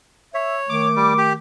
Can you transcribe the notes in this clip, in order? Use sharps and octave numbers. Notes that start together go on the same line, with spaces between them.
C#5 E5
D#3 A3 D6
G3
G4